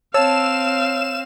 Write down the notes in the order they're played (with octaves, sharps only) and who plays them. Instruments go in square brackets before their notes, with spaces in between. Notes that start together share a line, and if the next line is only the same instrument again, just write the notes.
[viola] C4 F5 [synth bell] C#5 E6 [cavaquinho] A5 [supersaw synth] E7